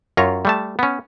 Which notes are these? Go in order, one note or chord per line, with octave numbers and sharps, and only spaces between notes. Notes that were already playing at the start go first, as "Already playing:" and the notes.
F#2 F4 C#5 A#5
G3 A3 A5
B3 C#4